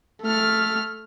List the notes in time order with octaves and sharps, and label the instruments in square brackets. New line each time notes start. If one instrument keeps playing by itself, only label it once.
[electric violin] A3 F6